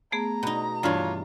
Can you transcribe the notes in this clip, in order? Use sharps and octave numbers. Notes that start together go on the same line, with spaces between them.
A3 B3 G#4 A#5
B2 D#4 B5 A#6
G2 E3 D4 F4 C#5